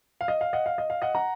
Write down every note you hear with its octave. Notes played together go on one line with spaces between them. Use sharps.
F5
D#5
F5
D#5 F#5
F5
D#5
F5
D#5 F#5
F#5 A#5